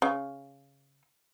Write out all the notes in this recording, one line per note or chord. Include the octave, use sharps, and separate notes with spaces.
C#3